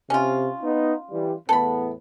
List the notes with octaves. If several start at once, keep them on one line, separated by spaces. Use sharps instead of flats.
C3 C#4 F4
B3 D#4
E3 G3
E2 A2 B3 A4 B5